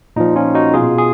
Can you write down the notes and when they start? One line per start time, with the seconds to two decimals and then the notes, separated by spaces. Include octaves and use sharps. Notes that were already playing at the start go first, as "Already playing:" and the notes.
0.16 A#2 F3 D#4
0.36 C#4 F4
0.55 D#4 F#4
0.74 B2 F4 G#4
0.98 G#4